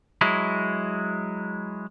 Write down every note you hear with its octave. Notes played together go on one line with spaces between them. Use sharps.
F#3 G#3 E4